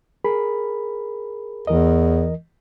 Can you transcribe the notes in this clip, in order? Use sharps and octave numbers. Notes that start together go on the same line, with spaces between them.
G#4 A#4 B5
E2 E3 A#4 D#5